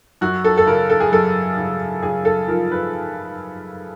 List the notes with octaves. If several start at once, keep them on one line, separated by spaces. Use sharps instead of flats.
F#2 F#4
A4
A4
C#3 A#4
A4
G#4
F#2 A4
C#3
C#3 G#4
A4
F3 A#4
B4